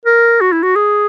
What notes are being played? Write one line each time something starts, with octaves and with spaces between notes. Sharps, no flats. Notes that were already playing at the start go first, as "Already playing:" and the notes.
A#4
F#4
E4
F#4
G#4